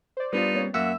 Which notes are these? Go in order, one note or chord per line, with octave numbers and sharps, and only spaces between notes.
C5 D5
G3 B3 D4 D#4 F4
A#3 C4 C#5
F#2 A#3 E5 F#5 E6